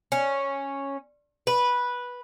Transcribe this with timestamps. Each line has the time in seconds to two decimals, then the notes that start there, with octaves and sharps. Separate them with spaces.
0.12 C#4
1.47 B4